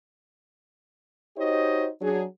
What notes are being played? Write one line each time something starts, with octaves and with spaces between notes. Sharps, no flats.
D#4 F#4 G4 C5 C#5 D#5
F#3 D4 G#4